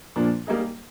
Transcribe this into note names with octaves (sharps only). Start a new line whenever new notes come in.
A#2 F3 A#3 D4
G3 A#3 D#4 G#4